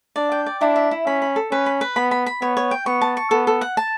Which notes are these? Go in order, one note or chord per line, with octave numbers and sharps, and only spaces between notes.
D4 D5
G5
D5
D4 E4
E5
E4
C#4 B5
B5
A4
C#4 B4
B5
B4
B3 B5
B5
B5
B3 C#5
C#5
G5
B3 C#6
A5
C#6
B3 A4
A4
F#5
A5